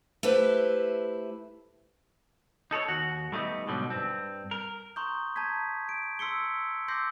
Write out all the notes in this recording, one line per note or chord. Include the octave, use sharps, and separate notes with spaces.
A3 E4 G4 B4 C5
D#4 A4 B4 C#5
D#2 F#4
G3 A3 B3 D#4
G#2 B2 D3 F#3 G3
G2 C4
A#4
A#5 C6 C#6 D#6 G6
A5 A#5 G6 G#6 B6
D7
C6 E6 B6 C#7 G7
C6 D6 E6 G6 A#6 C7